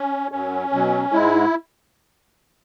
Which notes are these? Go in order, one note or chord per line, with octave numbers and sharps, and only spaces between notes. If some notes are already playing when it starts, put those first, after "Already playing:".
Already playing: C#4
F#2 F#3 C#4
B2 F#3
G#2 G#3 E4